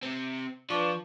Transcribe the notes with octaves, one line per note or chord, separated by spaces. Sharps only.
C3 C4
F3 D4 B4 F5 C#6